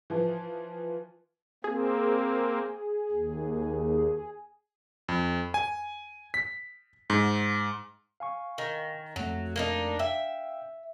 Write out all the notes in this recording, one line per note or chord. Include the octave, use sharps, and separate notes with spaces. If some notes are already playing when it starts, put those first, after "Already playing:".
E3 F3
A#3 C4 G#4
D#2
F2
G#5
B6
G#2
F5 G#5 C#6
D#3
F2 F#3 A3
A#3 D4 D#4
E5 F5 G5